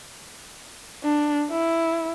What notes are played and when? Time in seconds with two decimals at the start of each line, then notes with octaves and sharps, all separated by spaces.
1.04 D4
1.51 E4